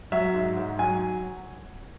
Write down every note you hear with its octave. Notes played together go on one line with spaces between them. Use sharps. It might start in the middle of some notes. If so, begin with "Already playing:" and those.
F#3 E5
G#2
G#2
F#3 G#5